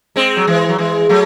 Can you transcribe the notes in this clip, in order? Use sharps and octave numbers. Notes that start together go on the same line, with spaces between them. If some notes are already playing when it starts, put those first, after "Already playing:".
G#3 C4
F#3
E3 G#3
F#3
E3 G#3
F#3 A3